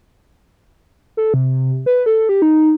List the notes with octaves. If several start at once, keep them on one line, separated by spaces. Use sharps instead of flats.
A4
C3
B4
A4
G4
D#4